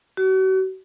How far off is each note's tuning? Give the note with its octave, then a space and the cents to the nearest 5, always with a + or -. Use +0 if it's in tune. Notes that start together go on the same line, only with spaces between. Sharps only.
F#4 +40